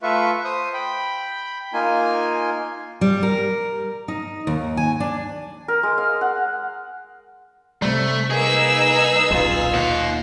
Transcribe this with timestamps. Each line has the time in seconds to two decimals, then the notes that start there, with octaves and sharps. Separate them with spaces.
0.03 A3 F4 B4 E5 C#6
0.45 C5 D#6
0.74 G5 B5
1.73 A#3 D#4 F4 G#5
3.01 G3
3.23 A#4
4.08 D#4
4.47 D#2
4.77 G#5
5.00 D4
5.68 A#4
5.83 G#3
5.98 F5
6.21 F#5
7.82 C3 G3 A3
8.30 A#3 D#4 G#4 B4 E6
9.31 D#1 B1 F4 F5
9.74 D#2 D#5 F#5